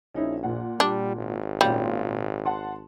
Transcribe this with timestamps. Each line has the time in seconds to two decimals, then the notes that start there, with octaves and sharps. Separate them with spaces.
0.14 A#1 C#4 D#4 E4
0.43 A#2 F#5
0.80 G3 D4
1.16 G#1
1.61 A#2 G3 C#4 F4
2.45 F#5 A5 C6